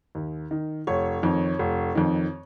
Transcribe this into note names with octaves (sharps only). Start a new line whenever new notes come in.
D#2
D#3
F1 C#5
F2 D#3
F1
F2 D#3